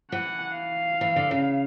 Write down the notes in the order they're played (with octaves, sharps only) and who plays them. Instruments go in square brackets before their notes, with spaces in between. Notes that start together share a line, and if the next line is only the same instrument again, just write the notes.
[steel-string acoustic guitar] E3 [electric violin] F#5
[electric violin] F5
[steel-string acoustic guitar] E3
D3
C#3